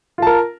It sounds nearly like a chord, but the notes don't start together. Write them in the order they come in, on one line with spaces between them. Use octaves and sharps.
F4 A5 A#4